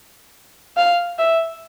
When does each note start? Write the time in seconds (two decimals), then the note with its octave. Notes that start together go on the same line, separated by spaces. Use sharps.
0.77 F5
1.18 E5